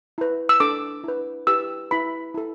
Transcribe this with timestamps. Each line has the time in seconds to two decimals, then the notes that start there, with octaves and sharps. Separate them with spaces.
0.18 E4 B4
0.49 E6
0.60 D4 A4 D6
1.04 E4 B4
1.47 E4 G4 B4 E6
1.91 E4 B4 B5
2.34 E4 A4